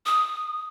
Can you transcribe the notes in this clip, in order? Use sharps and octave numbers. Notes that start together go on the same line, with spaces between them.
D#6